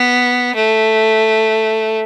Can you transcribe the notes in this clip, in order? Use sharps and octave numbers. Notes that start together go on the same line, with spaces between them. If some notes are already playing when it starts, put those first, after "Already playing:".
Already playing: B3
A3